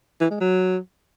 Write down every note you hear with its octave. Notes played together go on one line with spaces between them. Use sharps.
E3
G#3
F#3